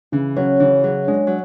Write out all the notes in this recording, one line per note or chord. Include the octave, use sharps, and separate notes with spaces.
C#3 E3
F#3 C#4
C#3 E3
F#3 G#4
G#3 D4
F#3